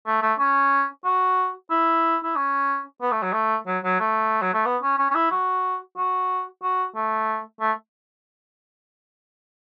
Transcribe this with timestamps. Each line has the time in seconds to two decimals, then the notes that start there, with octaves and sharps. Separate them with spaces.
0.07 A3
0.22 A3
0.39 C#4
1.05 F#4
1.71 E4
2.24 E4
2.36 C#4
3.02 B3
3.12 A3
3.23 F#3
3.33 A3
3.67 F#3
3.84 F#3
4.00 A3
4.42 F#3
4.54 A3
4.66 B3
4.82 C#4
4.99 C#4
5.11 C#4
5.15 E4
5.31 F#4
5.97 F#4
6.62 F#4
6.95 A3
7.61 A3